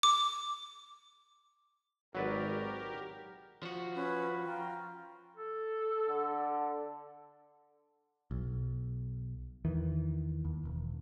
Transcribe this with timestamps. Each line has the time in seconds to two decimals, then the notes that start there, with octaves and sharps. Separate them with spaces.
0.03 D6
2.15 G#1 F#3 G4 A#4 B4 D5
3.63 F3 F#4
3.95 C#4 B4
4.44 F4 F#4 G5 A#5
5.37 A4
6.09 D3
8.31 B1
9.65 E2 D#3 E3
10.45 D#2
10.65 E1